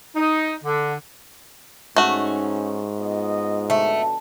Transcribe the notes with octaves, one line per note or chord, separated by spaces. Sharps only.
D#4
D3
G#2 A3 C#4 D#4 F#4
B3 F4 D#5
F2 B2 D3 A3